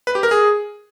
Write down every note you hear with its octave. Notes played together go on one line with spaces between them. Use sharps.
B4
G4
A#4
G#4